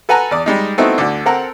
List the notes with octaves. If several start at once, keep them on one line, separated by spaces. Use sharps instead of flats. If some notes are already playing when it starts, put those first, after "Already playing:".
A4 B4 F#5 G#5 A#5
E2 D5 D#6
G3 G#3 D#4
A3 B3 C4 D#4 E4 F#4
D2 D3
C4 A4 A#4 F#5 A#5